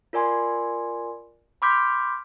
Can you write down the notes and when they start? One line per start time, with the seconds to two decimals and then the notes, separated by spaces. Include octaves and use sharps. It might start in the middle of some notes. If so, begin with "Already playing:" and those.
0.13 F4 A#4 D5 G#5 C6
1.62 B5 C6 D6 F6 G6 B6